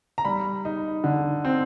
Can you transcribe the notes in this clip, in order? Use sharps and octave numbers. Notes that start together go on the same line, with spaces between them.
A#5
G3 B5
D#4
D3
C4